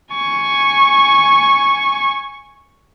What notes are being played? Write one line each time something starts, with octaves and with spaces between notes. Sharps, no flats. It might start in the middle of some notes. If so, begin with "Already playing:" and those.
G#5 C#6